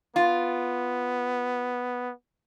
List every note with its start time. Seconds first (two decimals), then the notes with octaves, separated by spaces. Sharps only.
0.16 B3 F4